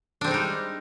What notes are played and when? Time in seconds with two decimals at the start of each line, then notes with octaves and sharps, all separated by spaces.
0.21 D4
0.24 C4
0.28 G#3
0.31 D#4
0.34 G3